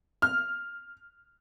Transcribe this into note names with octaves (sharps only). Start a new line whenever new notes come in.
F6